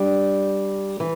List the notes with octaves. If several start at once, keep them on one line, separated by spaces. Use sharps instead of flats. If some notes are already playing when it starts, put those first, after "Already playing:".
Already playing: G3 D4
E3